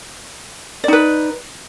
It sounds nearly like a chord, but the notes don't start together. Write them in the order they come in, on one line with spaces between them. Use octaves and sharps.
D5 D#4 B4